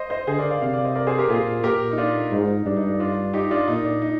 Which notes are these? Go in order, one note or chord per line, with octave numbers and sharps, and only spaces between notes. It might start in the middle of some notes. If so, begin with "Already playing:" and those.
Already playing: C5 D#5
C5 D#5
D3 G#4 C5
A#4 D5
D5 F5
C3 D5 F5
D5 F5
C5 D#5
A#4 D5
G#4 C5
G4 A#4
A#2 F4 G#4
A#2 G4 A#4
D#4
D4 F4
G#2 D#4
G2 D4
D#4
D4
D4 F4
D#4 G4
D4 F4
A#2 D#4
D4
D#4